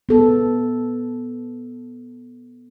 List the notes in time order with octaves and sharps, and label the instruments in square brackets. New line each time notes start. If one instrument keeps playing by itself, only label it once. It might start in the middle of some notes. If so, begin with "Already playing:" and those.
[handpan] B3 A4